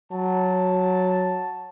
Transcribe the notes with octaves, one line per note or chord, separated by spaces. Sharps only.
F#3 A5